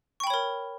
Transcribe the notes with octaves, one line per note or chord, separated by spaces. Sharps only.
A#4 C#5 G5 B5 C#6